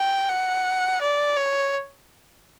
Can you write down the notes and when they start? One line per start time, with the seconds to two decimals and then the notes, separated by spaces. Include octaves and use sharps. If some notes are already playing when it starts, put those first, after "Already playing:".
Already playing: G5
0.29 F#5
1.01 D5
1.37 C#5